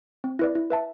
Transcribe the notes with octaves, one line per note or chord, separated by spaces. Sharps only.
C4
E4 B4 D5
E4
B4 E5 A5